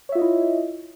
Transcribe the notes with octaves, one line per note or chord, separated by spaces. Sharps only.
E4 F4 C#5 D#5 E5